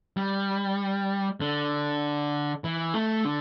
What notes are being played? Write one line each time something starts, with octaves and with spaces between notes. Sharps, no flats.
G3
D3
E3
A3
D3